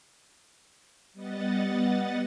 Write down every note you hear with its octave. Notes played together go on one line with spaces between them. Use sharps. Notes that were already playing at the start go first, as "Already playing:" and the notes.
G3 B3 D#5 F#5 A6